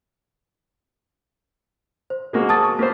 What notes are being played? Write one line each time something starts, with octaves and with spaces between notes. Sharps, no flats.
C5
G#3 A#3 F#4
A5 D#6 A6
C#6
A#3 C5 B6